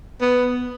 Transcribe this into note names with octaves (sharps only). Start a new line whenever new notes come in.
B3